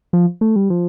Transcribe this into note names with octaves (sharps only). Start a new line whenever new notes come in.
F3
A3
G3
F3